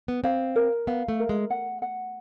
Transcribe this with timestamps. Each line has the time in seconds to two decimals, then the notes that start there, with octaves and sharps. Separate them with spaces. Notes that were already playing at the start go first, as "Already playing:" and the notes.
0.08 B3
0.24 C4 F5
0.56 A#4
0.87 B3 F5
1.08 A3
1.20 A#4
1.29 G#3
1.50 F#5
1.82 F#5